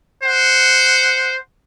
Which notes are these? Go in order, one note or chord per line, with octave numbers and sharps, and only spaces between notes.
C5 F#5